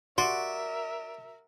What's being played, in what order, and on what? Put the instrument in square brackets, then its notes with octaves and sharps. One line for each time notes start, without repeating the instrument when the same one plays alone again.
[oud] F#4 [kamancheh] A#4 E5 [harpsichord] D5 [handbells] C6